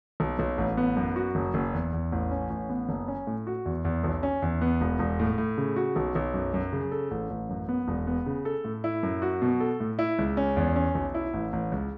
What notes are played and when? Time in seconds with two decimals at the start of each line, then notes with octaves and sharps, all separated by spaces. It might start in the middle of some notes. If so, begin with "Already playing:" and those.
0.20 B1
0.39 B1
0.58 A1
0.77 B3
0.97 F#2
1.16 F#4
1.35 F#1
1.54 F#1
1.73 E2
1.93 E2
2.12 A1
2.31 C#4
2.50 A1
2.70 B3
2.89 F#1
3.08 C#4
3.27 A2
3.47 F#4
3.66 E2
3.85 E2
4.04 B1
4.23 C#4
4.42 E2
4.61 B3
4.81 E1
4.99 E1
5.20 A2
5.38 A2
5.58 C#3
5.76 F#4
5.96 B1
6.15 B1
6.34 F#2
6.54 F#2
6.73 C#3
6.92 A4
7.11 A1
7.30 A1
7.49 F#2
7.69 B3
7.88 E1
8.07 B3
8.26 C#3
8.45 A4
8.65 A2
8.84 E4
9.03 F#2
9.22 F#4
9.42 B2
9.60 A4
9.80 A2
9.99 E4
10.19 C#2
10.37 C#4
10.57 E2
10.76 C#4
10.95 B1
11.15 E4
11.34 A1
11.53 A1
11.72 C#2